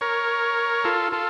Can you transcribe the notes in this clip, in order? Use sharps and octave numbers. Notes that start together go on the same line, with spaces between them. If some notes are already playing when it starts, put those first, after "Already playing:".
A#4 C#5
F4 A4
F4 A4